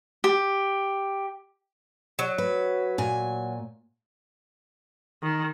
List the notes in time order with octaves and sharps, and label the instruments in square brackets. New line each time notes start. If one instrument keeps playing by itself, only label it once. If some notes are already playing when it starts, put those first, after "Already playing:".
[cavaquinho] G4
[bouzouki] F#3
[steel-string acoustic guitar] B4
A#2 G#5
[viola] D#3